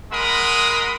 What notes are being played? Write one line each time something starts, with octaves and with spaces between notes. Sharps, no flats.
G#3 A#4 F#5 B5 C6 D#6